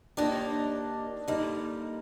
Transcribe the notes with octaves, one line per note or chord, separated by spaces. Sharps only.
D#2 D#3 A#3 D4 D#4 G4
D3 G3 A#3 D#4